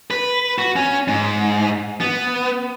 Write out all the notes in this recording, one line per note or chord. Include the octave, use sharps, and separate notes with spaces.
B4
F#4
C#4
G#2
B3